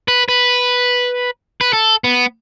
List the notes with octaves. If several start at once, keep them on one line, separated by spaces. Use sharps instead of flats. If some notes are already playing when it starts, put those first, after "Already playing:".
B4
B4
B4
A4
B3